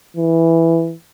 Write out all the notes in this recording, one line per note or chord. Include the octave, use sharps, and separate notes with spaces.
E3